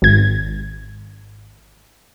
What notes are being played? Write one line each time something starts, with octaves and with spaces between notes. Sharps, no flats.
G#1 G#6